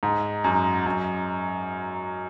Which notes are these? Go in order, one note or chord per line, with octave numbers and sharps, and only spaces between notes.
G#2
F#2
F#2